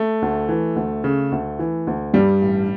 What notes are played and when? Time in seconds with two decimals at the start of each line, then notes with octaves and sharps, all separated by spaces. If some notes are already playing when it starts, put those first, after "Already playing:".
Already playing: A3
0.22 D2
0.49 E3
0.76 D2
1.04 C#3
1.32 D2
1.59 E3
1.87 D2
2.14 G2 G3
2.41 A1